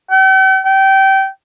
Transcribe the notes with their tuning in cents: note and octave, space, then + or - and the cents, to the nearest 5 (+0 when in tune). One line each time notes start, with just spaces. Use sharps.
G5 -45
G5 -20